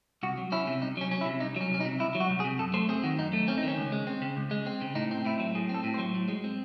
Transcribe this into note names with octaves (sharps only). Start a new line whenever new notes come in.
C2 F#4
F#3
C#4 E4
C3
C2 D#4
F#3 C#4
C#4
E4
C3
C2 D#4
F#3 C#4
C2 C#4
D#4
C3
C2 E4
F#3
F#4
C2
G#4
C3
F#2 A4
A3 C5
C4 G#4
D#3 F#4
F#2 D#4
A3
C4 C#4
D#4
D#3
C#4
C#2
G#3
C4
C#3
C#2
G#3
C4
C#3
A2 D#4
C4
A2 E4
F#3
A2 G#4
C4
A4
A2
C5
F#3
A2
G#3
C4